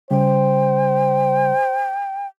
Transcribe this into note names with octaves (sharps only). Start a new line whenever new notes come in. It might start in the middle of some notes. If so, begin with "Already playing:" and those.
C#3 G3 C5 G5